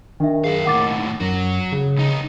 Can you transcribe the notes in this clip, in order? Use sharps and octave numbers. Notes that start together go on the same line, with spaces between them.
D#3 D4 E5
F#2 G#4 F5
D#2 A2 F#5 D6 A6
F#2 F#3 F#4
C#3
C2 D#4